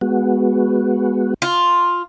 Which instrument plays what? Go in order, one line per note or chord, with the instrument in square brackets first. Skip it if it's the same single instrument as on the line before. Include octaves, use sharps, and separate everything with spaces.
[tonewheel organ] G#3 B3 F#4
[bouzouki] F4